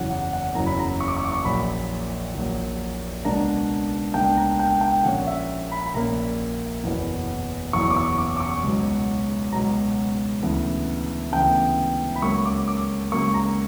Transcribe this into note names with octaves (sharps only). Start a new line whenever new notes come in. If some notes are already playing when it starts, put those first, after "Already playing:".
Already playing: F#1 E2 C#3 F#3 F#5
F#5
F#5
F#1 E2 C#3 F#3 A#5
B5
A#5
C#6
D6
C#6
D6
C#6
A#1 A#2 F#3 B5
A#1 A#2 F#3
C#2 B2 A#3 D4 A#5
C#2 B2 A#3 D4 G5
A#5
G5
G5
A#1 A#2 A#3 C#4 F#5
E5
B5
B5
A#1 A#2 A#3 C#4 A#5
F#1 E2 B2 F#3 B3
F#1 E2 B2 F#3 B3 C#6
D6
C#6
D6
D6
C#6
C#2 B2 F#3
C#2 B2 F#3 A#5
D2 C#3 E3 B3
D2 C#3 E3 B3 G5
B5
C#2 C#3 F#3 A#3 C#6
D6
D6
C#2 C#3 F#3 A#3 C#6
A#5